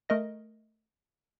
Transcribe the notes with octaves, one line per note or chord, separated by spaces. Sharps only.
A3 A#4 D#5 A#6